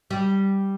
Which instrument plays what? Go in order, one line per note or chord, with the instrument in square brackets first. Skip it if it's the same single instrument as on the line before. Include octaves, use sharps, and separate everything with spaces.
[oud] G3